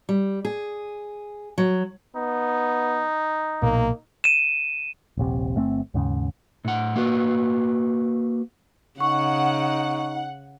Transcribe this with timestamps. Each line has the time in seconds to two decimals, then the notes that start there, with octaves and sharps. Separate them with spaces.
0.09 G3
0.45 G#4
1.58 F#3
2.16 B3 D#4
3.62 B1 A#2 A#3
4.24 D#7 E7
5.17 D#1 A#1 C3
5.56 G1 A3 C4
5.94 D#2 G#2 C#3
6.65 A2 F#5
6.96 A#3 F#4 B4
9.00 C#3 D#4 F#5 C#6